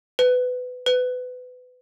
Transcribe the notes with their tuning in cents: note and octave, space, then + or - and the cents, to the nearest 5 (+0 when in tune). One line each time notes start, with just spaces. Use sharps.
B4 +20
B4 +25